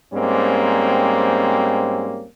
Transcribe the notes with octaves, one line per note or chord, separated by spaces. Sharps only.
G#2 G3 A#3 C4 C#4